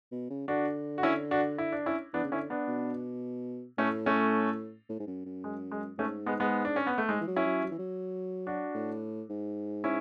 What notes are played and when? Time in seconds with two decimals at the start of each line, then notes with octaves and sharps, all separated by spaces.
0.12 B2
0.30 C#3
0.48 D3 D4 F#4
0.98 F#4
1.03 C#4 E4
1.31 D4 F#4
1.58 E4
1.72 D4
1.86 C#4 E4
2.13 E3 B3 D4
2.24 C#3
2.32 D3 C#4 E4
2.50 B3 D4
2.68 B2
3.78 A2 A3 C#4
4.06 A3 C#4
4.89 A2
5.00 G#2
5.07 F#2
5.26 F#2
5.44 G#3
5.72 G#3
5.98 G#2 A3 C#4
6.26 G#3 B3
6.40 G#3 B3
6.65 D4
6.76 C#4
6.87 B3
6.98 A3
7.09 G#2 G#3
7.21 E3
7.27 F#3
7.36 C#4 E4
7.45 F#3
7.64 F#3
7.71 E3
7.79 F#3
8.47 D4 F#4
8.74 A2
9.30 G#2
9.84 C#4 E4